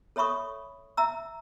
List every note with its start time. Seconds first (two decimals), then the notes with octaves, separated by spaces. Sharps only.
0.16 A4 C#5 E5 B5 C#6 D#6
0.97 E5 A#5 E6